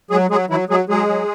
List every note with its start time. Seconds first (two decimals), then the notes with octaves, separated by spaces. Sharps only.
0.10 F#3 G#3 G#4
0.30 F#3 G#3 G#4
0.50 E3 F#3 E4
0.69 F#3 G#3 G#4
0.89 F#3 G#3 G#4
1.08 F#3